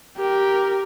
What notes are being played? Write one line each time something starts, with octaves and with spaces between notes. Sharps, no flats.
G4 A#4